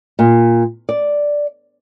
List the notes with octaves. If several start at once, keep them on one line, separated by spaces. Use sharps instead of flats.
A#2
D5